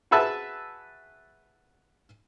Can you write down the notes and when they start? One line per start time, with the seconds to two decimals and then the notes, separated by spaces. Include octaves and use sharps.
0.11 F#4 G#4 B4 E5 F#5 A5